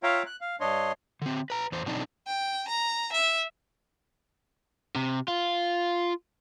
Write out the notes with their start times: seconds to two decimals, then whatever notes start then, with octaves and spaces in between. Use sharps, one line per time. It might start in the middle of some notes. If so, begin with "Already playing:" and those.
0.03 F4 C#5 E5 F5 G5 A#5
0.26 F#6
0.41 F5
0.60 G2 D4 C#5 D#5 C6
1.22 D3 C4
1.50 B4 A#5
1.72 E2 C5
1.86 B2 D3 F#3 C4 D4 D#4
2.27 G5
2.68 A#5
3.12 E5
4.96 C3
5.28 F4